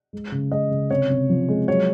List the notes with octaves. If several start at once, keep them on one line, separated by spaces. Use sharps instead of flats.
G#3
C#3
G#3 D#5
C#3
C3 C#5
C3
F3
G#3
F#3 C#5